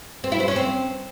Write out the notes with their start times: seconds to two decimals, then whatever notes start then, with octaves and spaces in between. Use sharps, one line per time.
0.24 C4
0.32 E4
0.40 C5
0.48 C#4
0.56 C4